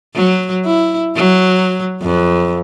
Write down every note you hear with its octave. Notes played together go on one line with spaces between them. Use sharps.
F#3
E4
F#3
F2